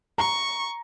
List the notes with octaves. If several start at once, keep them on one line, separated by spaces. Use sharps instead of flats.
A#5 C#6